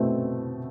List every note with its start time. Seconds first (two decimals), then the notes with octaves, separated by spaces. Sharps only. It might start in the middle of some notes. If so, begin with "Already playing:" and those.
Already playing: B2 A3 C4